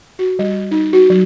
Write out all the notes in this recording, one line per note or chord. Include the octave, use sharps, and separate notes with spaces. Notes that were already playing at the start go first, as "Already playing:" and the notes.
F#4
G3
D#4
F#4
F#3